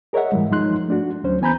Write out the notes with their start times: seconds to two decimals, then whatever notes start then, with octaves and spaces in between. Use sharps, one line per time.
0.13 G#4 A#4 C#5 D#5 E5 F#5
0.32 G#2 E3 G3 G#3
0.50 G2 F3 G#3 D#4 C6 F#6
0.88 A3 D4 F#4
1.24 D2 F#3 C#4 C5
1.41 E3 B3 G#5 A#5 B5 G6